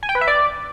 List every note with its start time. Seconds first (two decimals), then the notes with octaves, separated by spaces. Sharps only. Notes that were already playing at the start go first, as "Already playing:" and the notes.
0.03 G#5
0.09 G5
0.15 B4
0.21 E5
0.27 D5